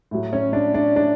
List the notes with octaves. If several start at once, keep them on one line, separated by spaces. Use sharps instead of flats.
A2 F#3
C#4
D4
D4
D4